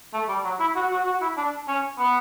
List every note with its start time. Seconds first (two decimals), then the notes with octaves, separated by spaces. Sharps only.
0.13 A3
0.28 G3
0.44 F#3
0.60 E4
0.75 F#4
0.91 F#4
1.06 F#4
1.21 E4
1.37 D4
1.68 C#4
1.98 B3